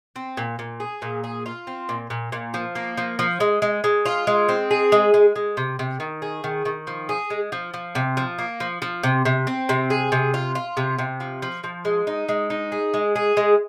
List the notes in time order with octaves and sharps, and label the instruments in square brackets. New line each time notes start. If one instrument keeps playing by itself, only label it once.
[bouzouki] C4
A#2
A#2
G#4
A#2
G#4
F4
C4
A#2
A#2
A#2
F3
A#3
F3
F3
G#3
G#3
G#3
F4
G#3
C4
G#4
G#3
G#3
G#3
C3
C3
D#3
G#4
D#3
D#3
F3
G#4
G#3
F3
F3
C3
F3
A#3
F3
F3
C3
C3
C4
C3
G#4
C3
F4
F4
C3
C3
F3
F3
F3
G#3
D#4
G#3
D#4
G#4
G#3
G#4
G#3